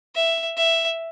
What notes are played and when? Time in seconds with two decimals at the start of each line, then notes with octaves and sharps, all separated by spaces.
0.16 E5
0.57 E5